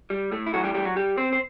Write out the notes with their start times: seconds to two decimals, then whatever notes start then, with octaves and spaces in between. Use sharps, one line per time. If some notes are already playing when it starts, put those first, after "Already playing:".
0.10 G3
0.32 A2 A3
0.47 E4
0.53 B1 A2 E3 F#3 F#4
0.64 G3 G4
0.74 G3 G4
0.85 F#3 F#4
0.96 G3 G4
1.17 C4 C5
1.33 C5